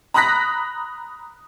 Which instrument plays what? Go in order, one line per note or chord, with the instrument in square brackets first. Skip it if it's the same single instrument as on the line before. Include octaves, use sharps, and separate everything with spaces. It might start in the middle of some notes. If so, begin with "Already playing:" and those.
[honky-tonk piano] A#5 B5 D#6 F#6 A#6 B6